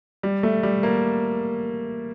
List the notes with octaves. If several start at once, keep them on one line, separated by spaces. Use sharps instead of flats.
G3
A3
G3
A#3